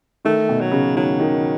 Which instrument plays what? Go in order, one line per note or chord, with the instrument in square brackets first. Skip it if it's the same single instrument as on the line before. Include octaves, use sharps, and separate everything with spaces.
[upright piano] D#3 [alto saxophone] A3
[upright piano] B2
[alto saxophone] F#3
[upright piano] C#3
[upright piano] D#3 [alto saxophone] F#3
[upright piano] D#3